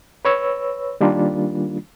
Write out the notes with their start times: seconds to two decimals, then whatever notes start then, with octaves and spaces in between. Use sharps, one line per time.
0.25 B4 C#5 E6
1.01 D#3 G3 A#3 D4 F4